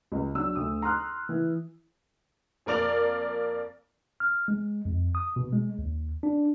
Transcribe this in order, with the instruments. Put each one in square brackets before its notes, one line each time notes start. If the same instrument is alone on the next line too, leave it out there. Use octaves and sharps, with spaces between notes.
[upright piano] C#2
F#3 D4 E6
D2 D#6
A#5 C6 D#6 F6 F#6
E3
[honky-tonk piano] F2 A#3 A#4 D5 F7
[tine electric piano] F6
G#3
F2
D#6
B2
G#3
D#2
D4